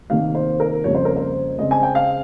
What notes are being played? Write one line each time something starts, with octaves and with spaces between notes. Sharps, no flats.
C3 D#3 A#3 F5
C5
A#4
F2 C#3 G3 A#3 C#5
C5
A#4
C5
C#3 G#3 C4 D#5
G#5
G5
F5